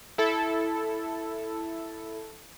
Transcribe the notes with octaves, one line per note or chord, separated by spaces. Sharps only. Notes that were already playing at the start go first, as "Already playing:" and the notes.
E4 A4